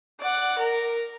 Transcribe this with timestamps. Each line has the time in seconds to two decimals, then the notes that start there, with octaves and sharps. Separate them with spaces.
0.20 D5 F#5
0.58 A#4